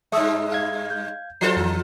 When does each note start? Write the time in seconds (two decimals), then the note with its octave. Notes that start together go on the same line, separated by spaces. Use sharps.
0.12 G2 G#3 E5 D#6 E6
0.52 F5 G#6
0.90 G6
1.41 F3 F4 A4 C5 C7
1.57 F2 E3